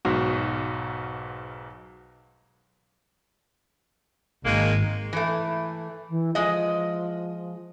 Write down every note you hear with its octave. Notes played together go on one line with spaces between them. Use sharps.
B1 G#2 B2 F#4
G#1 D#3 G#3 A#3
E3 A3
E3
F3 G#3 D#5